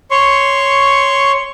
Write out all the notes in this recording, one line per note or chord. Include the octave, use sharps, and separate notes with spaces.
C#5 C6 C#6